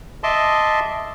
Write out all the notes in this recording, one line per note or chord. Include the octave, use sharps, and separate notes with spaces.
D#5 E5 A5 C6 D6